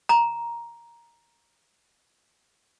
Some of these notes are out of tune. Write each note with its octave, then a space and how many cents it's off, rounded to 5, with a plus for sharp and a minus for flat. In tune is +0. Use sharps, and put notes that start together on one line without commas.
A#5 +5